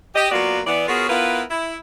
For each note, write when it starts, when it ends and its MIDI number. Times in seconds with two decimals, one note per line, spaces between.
0.15 0.29 67
0.15 0.29 75
0.31 0.60 54
0.31 0.60 58
0.31 0.60 59
0.31 0.60 65
0.31 0.60 66
0.31 0.60 74
0.67 0.85 52
0.67 0.85 59
0.67 0.85 74
0.88 1.09 59
0.88 1.09 65
0.88 1.09 66
0.88 1.09 68
0.88 1.09 70
0.88 1.09 73
1.09 1.42 59
1.09 1.42 64
1.09 1.42 65
1.09 1.42 70
1.09 1.42 71
1.50 1.76 64